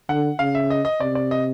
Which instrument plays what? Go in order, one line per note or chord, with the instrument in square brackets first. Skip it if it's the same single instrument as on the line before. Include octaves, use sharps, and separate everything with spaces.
[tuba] D3 [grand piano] F#5
[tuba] C#3 [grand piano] F5
[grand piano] E5
D#5
D#5
[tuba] C3 [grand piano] D5
[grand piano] D5
D#5